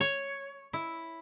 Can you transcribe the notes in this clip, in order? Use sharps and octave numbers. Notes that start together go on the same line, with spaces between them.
C#5
E4